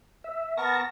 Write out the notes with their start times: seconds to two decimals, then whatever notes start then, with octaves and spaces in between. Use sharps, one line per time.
0.24 E5
0.57 B3 A#4 A5 C#6 A#6